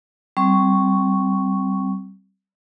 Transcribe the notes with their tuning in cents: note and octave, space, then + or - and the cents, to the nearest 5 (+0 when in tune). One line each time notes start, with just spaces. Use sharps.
G3 -20 C4 +0 C#6 +0